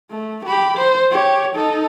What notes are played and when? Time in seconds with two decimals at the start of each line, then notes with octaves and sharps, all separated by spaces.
0.11 A3
0.45 G4 B5
0.77 C5
1.12 G4 C#5
1.56 D#4 A4